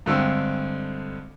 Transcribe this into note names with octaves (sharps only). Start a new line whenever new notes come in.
G2 D3 G#3 C4